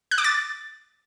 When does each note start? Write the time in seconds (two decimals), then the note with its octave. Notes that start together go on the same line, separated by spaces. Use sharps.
0.11 F#6
0.18 D6
0.24 A6